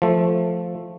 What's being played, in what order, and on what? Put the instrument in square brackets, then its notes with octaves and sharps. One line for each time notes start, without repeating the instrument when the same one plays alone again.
[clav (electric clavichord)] F3 A3